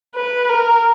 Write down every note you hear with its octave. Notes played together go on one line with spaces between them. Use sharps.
B4
A#4